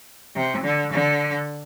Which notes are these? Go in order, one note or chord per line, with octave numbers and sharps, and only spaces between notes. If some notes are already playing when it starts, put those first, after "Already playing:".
C3
D3
D3